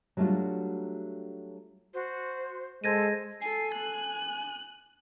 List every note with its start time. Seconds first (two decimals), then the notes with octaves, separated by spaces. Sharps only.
0.17 F#3 G3 A3 D4 F4 F#4
1.94 F#4 C5
2.84 G#3 A4 C5 G#6 A#6 D#7
3.41 A4 G#5 C7
3.75 F#6